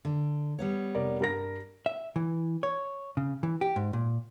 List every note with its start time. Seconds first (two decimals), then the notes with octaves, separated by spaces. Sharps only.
0.05 D3
0.59 G3 B3 C#5
0.95 F1 A#4 D5
1.20 G2 A#4 A#6
1.86 E5
2.16 E3
2.63 C#5
3.17 C#3
3.43 E3
3.61 G4
3.76 G#2
3.93 A#2